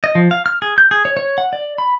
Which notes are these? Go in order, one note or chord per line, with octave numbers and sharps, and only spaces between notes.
D#5
F3
F5
F6
G#4
G6
G#4
C#5
C#5
F#5
D5
B5